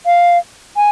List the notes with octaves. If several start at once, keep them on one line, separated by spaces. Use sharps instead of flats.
F5
G#5